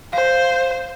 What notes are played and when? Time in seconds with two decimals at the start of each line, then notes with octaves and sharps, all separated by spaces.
0.13 C5 F5